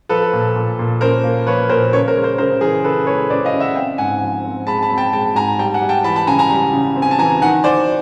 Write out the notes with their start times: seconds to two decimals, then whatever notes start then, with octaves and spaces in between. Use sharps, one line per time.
0.09 F3 A4 B4
0.33 A#2
0.56 A#2
0.79 A#2
1.01 C#4 A#4 C5
1.24 A#3
1.47 F3 B4 C#5
1.69 A#2 A#4 C5
1.93 C#3 B4 C#5
2.08 A#4 C5
2.15 G#3
2.23 A#4 C5
2.38 C#3 A#4 C5
2.61 E3 G#4 A#4
2.84 C#3 A4 B4
3.07 G#3 B4 C#5
3.30 C#3 C5 D5
3.45 D#5 F5
3.54 C#3
3.60 E5 F#5
3.76 C4 F5 G5
3.98 G#2 F#5 G#5
4.22 F3
4.44 C4
4.67 G#3 A5 B5
4.82 A5 B5
4.90 C4
4.98 G5 A5
5.12 G#3 G5 A5
5.35 G#2 G#5 A#5
5.59 G3 G5 A5
5.74 F#5 G#5
5.82 G3
5.89 G5 A5
6.04 E3 A5 B5
6.16 A5 B5
6.27 C#3 G#5 A#5
6.39 G#5 A#5
6.50 G3
6.73 C#3
6.96 C4
7.02 G#5
7.11 A5
7.19 E3 G#5 A#5
7.42 D#3 F#5 G#5
7.64 D#3 C5 D5